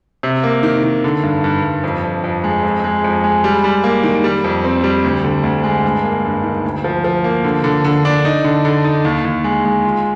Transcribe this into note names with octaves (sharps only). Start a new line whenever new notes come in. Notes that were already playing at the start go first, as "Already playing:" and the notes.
C3
A#3
D#3
D#3
D3
G2
G2
G2
F2
F2
F2
G#3
F2
G#3
F2
G#3
G3
G3
A#3
D#3
G3
F2
C4
G3
D2
D3
D2
G#3
G2
A#3
G2
D#3
D2
F3
F3
A#3
D3
D3
D3
D4
D#4
D3
D3
D#4
D#2
D#2
G#3
G#3
F4